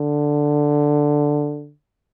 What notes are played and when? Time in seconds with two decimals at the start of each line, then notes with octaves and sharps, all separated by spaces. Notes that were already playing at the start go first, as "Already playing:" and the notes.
Already playing: D3